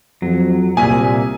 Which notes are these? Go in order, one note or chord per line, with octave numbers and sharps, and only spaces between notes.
F2 F#3
C2 A#2 G#4 E5 G#5